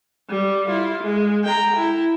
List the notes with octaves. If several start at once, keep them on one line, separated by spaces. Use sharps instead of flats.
G3
E4 F4
G#3
G5 A#5
E4